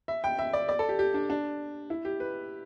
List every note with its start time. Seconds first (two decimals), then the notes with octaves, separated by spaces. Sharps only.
0.08 E5
0.24 G5
0.39 E5
0.53 D5
0.69 D5
0.79 A4
0.89 G4
0.99 G4
1.14 D4
1.30 D4
1.90 E4
2.05 G4
2.20 B4